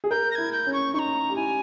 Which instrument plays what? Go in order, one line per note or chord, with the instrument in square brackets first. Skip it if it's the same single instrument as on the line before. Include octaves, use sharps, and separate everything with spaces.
[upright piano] G#4
[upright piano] A#4 [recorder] G6
[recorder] A#6
[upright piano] E4 [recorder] G#6
[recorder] G6
[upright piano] C#4
[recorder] C#6
[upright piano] D#4 [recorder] C#6
[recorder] A#5
[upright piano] G4
[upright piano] E4 [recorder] G#5